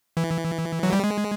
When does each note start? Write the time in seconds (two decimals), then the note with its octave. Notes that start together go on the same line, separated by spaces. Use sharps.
0.17 E3
0.83 F#3
0.93 G3
1.04 G#3